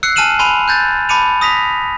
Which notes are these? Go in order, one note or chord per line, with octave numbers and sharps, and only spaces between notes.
E6 F#6 C7 C#7
G#5 A5 F6 D#7 E7 F#7
G#5 B5 C6 D#7 F7
F#6 G6 A6
A5 B5 D6 C#7 D#7 F7
D#6 A#6 B6 F7